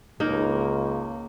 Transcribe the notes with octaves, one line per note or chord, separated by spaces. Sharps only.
C#2 A#3 D#4